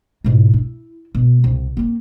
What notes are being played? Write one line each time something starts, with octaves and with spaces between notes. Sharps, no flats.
G#2 B2
E4
B2
C2
A#3 C4